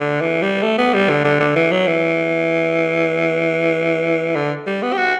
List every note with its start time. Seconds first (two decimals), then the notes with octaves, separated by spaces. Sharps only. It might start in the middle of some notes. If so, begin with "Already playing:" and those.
0.01 D3
0.21 E3
0.42 G3
0.62 A3
0.78 B3
0.94 G3
1.09 D3
1.24 D3
1.40 D3
1.56 E3
1.71 F#3
1.87 E3
4.35 D3
4.66 G3
4.82 B3
4.93 G4
4.97 F#4